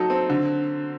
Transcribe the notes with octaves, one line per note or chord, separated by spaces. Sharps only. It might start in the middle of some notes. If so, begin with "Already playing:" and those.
Already playing: F#3 D#4 A4
C4
D3